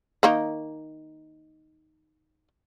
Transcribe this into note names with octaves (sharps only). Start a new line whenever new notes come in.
D#3 A#3 D#4